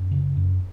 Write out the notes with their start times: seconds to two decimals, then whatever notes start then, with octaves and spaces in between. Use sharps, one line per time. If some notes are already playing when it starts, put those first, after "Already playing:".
Already playing: F#2
0.11 C#3
0.37 F#2